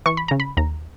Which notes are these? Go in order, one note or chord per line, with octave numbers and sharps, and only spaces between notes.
E3 C#6
B5
C#3 A#5
B5
D#2 A#5